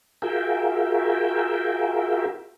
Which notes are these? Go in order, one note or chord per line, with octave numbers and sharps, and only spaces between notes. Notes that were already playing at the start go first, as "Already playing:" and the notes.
F4 F#4 G#4 A#4 E5 G5